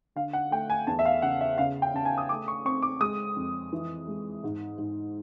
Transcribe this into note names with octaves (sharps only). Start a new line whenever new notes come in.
D3 F5
F#5
A3 G5
G#5
E2 A5
E5
F5
C#3 F#5
E5
C#3 F5
G5
C#3 A5
G#5
D#6
A3 D6
C#6
C4 C#6
D6
G#3 D#6
F2
E3
G#3
G#2
G#2